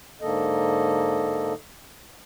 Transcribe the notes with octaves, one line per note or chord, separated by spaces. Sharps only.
G#2 D3 A#3 A4 D#5